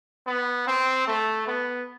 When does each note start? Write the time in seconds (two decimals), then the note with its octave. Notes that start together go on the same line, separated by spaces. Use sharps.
0.27 B3
0.67 C4
1.08 A3
1.47 B3